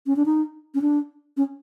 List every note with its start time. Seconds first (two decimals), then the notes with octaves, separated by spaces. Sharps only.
0.06 C#4
0.16 D4
0.26 D#4
0.74 C#4
0.82 D4
1.37 C#4